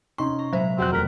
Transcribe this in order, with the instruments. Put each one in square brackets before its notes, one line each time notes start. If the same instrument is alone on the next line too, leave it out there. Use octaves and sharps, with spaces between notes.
[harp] C3 [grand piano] C#4 D#4 C6 [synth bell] C#6
[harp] A#5
[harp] A#2 G#3 B3 [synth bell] F#3 C5 [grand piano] E5
[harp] D#1 F2 G5 [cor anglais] C4 [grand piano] F#4 F#6
[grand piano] E1 A3 B6 [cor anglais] A#4